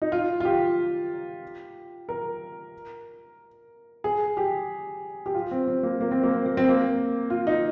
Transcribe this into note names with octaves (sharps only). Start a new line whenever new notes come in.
D#4
F4
F4
G4
A#4
G#4
G4
G4
F4
C4
C4
A#3
A#3
C4
A#3
C4
A#3
C4
A#3
F4
D#4